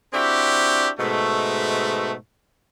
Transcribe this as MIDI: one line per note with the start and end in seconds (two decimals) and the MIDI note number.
0.13 0.89 60
0.13 0.89 62
0.13 0.89 64
0.13 0.89 66
0.13 0.89 67
0.98 2.14 44
0.98 2.14 47
0.98 2.14 56
0.98 2.14 57